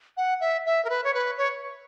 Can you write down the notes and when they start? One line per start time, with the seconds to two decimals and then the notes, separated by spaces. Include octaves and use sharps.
0.17 F#5
0.40 E5
0.66 E5
0.85 A#4
0.90 B4
1.04 C#5
1.14 B4
1.38 C#5